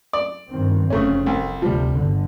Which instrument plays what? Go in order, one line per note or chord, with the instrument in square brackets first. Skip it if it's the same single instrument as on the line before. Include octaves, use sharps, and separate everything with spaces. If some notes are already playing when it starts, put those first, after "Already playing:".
[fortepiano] D5
[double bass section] G2 D#3 C4
[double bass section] F1 F2 [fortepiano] C#3 A3 C#4
[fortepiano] C2
[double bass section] D2 C3 [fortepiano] F3 G3
[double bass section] G1 D3